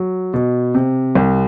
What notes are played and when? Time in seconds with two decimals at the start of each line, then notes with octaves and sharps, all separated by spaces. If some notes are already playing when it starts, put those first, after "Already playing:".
Already playing: F#3
0.34 B2
0.75 C3
1.15 C2